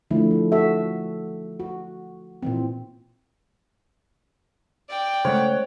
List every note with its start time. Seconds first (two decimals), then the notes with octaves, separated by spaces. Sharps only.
0.11 D3 F3 A3 E4
0.31 F3
0.52 F#4 A4 E5
1.60 F#4
2.43 A#2 E3 C4
4.89 D5 G5
5.25 C#3 G#3 A3 C5 C#5 F#5